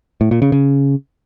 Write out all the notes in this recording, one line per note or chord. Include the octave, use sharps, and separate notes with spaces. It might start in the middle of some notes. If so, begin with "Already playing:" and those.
A2
A#2
C#3
C#3